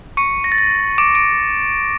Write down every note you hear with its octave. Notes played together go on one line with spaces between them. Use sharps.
C#6 C#7
A#6
A6
A#6
D6 D7
D7